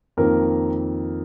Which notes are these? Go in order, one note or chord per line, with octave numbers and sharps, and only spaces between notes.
F2 D#3 A#3 A#4